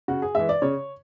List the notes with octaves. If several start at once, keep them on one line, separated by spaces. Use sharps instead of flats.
C#3 F#4
G#4
E3 G#3 E5
D5
C#3 C#5